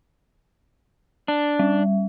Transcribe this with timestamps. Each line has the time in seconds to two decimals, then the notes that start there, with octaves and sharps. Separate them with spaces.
1.28 D4
1.59 G3